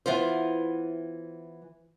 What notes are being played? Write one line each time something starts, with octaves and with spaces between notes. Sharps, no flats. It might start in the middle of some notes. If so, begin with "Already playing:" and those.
E3 B3 F4 C5